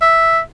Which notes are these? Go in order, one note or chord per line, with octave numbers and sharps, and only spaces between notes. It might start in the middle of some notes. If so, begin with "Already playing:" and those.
E5